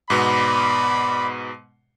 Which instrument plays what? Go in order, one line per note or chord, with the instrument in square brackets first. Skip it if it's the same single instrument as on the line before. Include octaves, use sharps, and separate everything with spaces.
[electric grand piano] G#2 B2 B3 [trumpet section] D5 B5